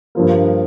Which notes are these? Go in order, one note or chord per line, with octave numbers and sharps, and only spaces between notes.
G2 F3 A#3